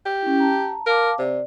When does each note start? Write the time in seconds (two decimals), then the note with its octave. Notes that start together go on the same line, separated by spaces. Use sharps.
0.06 G4
0.22 C#4 E4
0.40 A5 A#5
0.86 A#4 F5 A5 D6
1.18 C3 D5